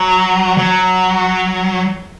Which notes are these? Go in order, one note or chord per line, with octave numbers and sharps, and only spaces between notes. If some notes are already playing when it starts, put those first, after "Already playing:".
Already playing: F#3
F#3